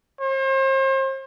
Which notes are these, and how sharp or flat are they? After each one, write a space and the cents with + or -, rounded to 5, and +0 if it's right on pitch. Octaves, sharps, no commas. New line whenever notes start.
C5 +40